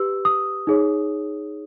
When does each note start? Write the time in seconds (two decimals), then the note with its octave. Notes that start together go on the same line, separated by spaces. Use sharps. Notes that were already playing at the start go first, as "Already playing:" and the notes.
Already playing: G4 B4 E6
0.25 D#6
0.67 D#4 G#4 C#5